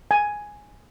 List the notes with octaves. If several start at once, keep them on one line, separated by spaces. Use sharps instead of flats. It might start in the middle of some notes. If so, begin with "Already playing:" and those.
G#5